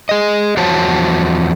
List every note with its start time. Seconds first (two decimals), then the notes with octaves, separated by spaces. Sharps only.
0.09 G#4 D#5
0.57 E2 F3 F#4 C5 C#5 A5